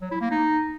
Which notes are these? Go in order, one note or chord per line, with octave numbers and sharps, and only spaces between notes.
F#3
E4
A#3
D#4